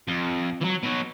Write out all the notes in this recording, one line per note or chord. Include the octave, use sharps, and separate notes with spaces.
F2
E3 F#3
B2 F#3